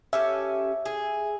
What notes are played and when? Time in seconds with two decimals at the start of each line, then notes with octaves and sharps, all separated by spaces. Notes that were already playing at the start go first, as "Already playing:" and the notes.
0.13 C#4 G4 A4 E5
0.85 G#4